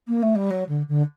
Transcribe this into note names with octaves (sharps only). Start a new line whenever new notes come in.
A#3
A3
G3
F#3
D3
D3